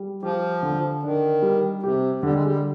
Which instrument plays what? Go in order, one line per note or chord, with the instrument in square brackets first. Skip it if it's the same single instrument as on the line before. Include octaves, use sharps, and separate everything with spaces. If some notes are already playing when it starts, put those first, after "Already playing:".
Already playing: [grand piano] G3
[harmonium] F3 [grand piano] G4
[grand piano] D3
[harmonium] D#3 [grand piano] D4
[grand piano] G3
[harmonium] C3 [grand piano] G4
[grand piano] D3 [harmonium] G3
[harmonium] G#3
G3